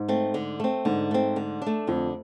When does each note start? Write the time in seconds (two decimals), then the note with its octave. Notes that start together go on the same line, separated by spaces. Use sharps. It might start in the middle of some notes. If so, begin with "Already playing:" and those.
Already playing: G#2
0.08 A3 C4
0.34 D3
0.60 A3 C4
0.85 G#2 D3
1.11 A3 C4
1.36 D3
1.62 A3 D4
1.87 F2 D3